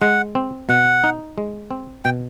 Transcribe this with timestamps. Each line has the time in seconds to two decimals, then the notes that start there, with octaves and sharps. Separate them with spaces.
0.01 G#3 F#5
0.35 C4
0.69 B2 F#5
1.04 D#4
1.38 G#3
1.71 C4
2.05 B2 G5